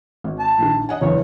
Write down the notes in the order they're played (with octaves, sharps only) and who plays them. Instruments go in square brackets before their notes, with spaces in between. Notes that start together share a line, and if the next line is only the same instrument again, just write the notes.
[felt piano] G#1
[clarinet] A5
[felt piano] A#1 D#3
D#5 F#5 G#5
[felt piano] F#1 E2 E3 [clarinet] C#5